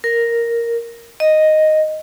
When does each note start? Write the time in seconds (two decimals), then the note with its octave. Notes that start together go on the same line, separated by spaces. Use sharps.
0.04 A#4
1.20 D#5